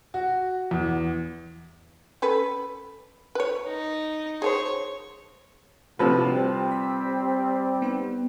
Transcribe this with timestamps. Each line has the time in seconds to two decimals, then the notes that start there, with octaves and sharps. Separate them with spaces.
0.14 F#4
0.71 E2
2.22 C#4 A4 B4
3.35 B4 C#5
3.67 D#4
4.42 G#4 A4 C5 C#5
5.99 A2 C3 F3 D4 F#4 B4 A5 E6
6.31 G3 C4
6.71 B5 B6
7.82 B3 D#4 F#5